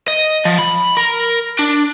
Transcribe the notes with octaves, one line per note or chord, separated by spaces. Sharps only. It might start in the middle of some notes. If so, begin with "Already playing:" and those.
D#5
F3
B5
A#4
D4